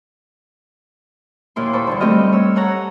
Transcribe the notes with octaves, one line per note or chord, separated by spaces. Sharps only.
D#2 A#2 E4 C6
C5 A5 B5 C#6
E2 G2 D3
G3 A3 C4 G4 D#5 F6
C#5 E6
A4 C#5 F#5 A#5